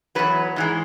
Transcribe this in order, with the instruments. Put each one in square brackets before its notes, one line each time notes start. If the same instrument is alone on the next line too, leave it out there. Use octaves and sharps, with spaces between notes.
[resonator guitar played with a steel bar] E2 B2 F#3 B4
G#2 E3 G#3